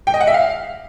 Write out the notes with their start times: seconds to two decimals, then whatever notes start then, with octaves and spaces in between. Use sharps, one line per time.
0.07 G5
0.14 D#5
0.21 F#5
0.27 E5
0.34 F5